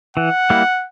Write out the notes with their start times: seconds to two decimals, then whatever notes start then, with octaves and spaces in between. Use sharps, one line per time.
0.17 E3 F#5
0.50 G3 A#3 E4